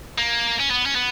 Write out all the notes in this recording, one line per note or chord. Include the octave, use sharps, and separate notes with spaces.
A#3
C#4
B3
C#4
B3